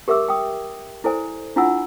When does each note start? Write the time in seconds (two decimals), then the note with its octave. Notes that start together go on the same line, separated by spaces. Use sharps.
0.08 G4 A#4 E5 D6 E6
0.28 G5 D#6
1.04 E4 A4 C5 D5 G#5
1.56 D4 E4 F4 F#5 G#5 E6